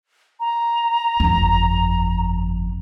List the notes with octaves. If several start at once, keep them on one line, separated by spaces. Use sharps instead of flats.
A#5
G1 F2